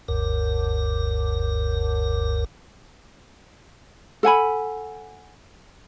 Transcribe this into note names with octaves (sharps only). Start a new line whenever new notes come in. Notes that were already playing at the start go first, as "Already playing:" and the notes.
F#1 D2 G2 A#4
A4 F#5 G#5 B5